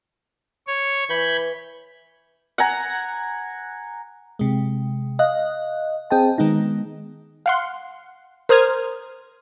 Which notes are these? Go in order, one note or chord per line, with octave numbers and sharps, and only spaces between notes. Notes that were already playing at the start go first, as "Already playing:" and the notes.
C#5
E3 B5 G6 G#6
F#5 G#5 A#5
C3 G#3
D#5 F5 F#6
C4 G#4 D#5 G5 A5
D#3 G#3 B3 D#4
F5 F#5 C6
A#4 C5 D#6 F6 G#6